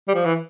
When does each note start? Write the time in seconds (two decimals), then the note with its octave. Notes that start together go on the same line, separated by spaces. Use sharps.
0.08 G3
0.14 F3
0.25 E3